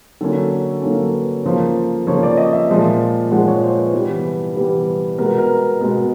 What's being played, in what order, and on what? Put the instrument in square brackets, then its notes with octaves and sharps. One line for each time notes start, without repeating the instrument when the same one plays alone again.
[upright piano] D3 F#3 A#3 C#4 A4
A4
D3 F#3 A#3 C#4 A4
B4
C#3 F3 A#3 C5
C#3 F3 A#3 C#5
D5
D#5
E5
A#2 F3 G#3
A#2 F3 G#3 F#5
C#5
C5
B4
C3 E3 G3 B3
C3 E3 G3 B3
B2 G#3 B3 A#4
A#4
B2 G#3 B3